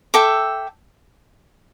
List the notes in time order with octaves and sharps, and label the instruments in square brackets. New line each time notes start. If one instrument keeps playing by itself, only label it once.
[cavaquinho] A4 E5 G5 D6